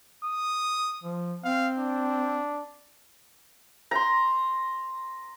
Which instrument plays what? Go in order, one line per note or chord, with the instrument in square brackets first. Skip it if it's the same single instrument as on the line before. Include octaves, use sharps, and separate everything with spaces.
[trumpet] D#6
[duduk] F3
[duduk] C4 [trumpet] F5
[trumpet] D4
[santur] A#5 C6